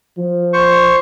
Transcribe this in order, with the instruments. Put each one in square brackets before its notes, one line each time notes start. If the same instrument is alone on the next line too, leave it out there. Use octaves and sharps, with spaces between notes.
[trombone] F3
[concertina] C5 C#6